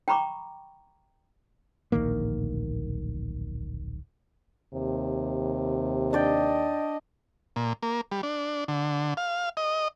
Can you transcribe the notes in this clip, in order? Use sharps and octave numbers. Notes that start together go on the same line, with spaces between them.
G5 A#5 B5 C#6 D6
D1 A#1 D#3 A#3
D#2 C3
D4 D5 D#5 G5
A#2
A#3
G3
D4
D3
F5
D#5